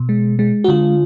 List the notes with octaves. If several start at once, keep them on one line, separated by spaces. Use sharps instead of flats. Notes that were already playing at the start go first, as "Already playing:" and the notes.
Already playing: B2
G#3
G#3
F#4
D3 F4